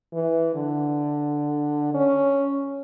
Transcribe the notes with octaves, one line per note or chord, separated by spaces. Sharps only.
E3
D3
C#4